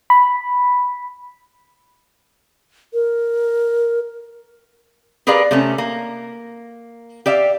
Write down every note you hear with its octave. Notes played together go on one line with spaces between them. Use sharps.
B5
A#4
G4 G#4 A#4 B4 D5 F5
C3 A3 C#4
A#3
G4 D5 E5 F5